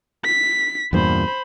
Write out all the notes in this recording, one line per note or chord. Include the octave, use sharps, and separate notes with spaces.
B6
E2 G2 A#2 C5 B5